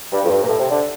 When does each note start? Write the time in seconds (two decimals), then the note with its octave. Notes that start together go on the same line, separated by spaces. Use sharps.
0.12 G2
0.25 F2
0.30 G2
0.43 A#2
0.48 A2
0.59 C3
0.70 D3